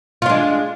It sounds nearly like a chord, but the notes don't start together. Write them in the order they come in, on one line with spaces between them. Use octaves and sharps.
F4 D4 G#3